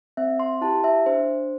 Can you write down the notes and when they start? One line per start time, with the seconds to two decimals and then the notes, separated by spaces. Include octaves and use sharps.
0.17 C4 E5
0.40 C6
0.61 E4 G4 A5
0.84 E5
1.06 D4 C5